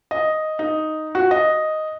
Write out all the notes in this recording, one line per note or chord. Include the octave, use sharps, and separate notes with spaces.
D#5
D#4
F#4
D#5